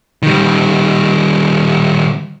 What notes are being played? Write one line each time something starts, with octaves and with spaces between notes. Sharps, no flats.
D#3 G3